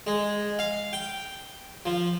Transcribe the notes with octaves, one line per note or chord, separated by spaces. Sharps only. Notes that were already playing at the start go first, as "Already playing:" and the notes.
G#3
F5
G5
F3